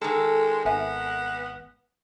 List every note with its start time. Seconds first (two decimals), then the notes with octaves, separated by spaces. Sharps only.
0.01 D#3 G#3 A4
0.65 G#1 B3 E5 G#5